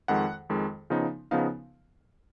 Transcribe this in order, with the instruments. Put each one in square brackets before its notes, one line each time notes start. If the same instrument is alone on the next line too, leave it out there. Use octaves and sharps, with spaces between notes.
[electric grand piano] F2 D#3 G#3 F#5
F2 D#3 G#3
C#3 F3 B3 D#4
C#3 F3 B3 D#4 F5